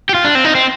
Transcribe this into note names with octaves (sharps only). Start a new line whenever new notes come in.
G4
F4
D4
C4
D#4
C4